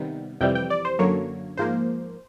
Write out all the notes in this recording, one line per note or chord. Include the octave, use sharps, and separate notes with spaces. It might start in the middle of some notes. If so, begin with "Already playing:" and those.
Already playing: C3 D#3 G3 B3
F2 C3 E3 G3 G5
G5
D5
C5
F#2 D3 F#3 A#3 C#5
G#2 F3 A#3 C5